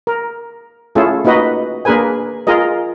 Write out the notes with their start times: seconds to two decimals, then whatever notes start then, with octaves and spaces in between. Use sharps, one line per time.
0.07 A#4
0.95 A3 C#4 E4 F4 G#4 A4
1.25 A#3 D#4 F#4 B4 D#5
1.85 A#3 D4 G#4 A#4 B4 G#5
2.47 F4 G#4 A#4 D#5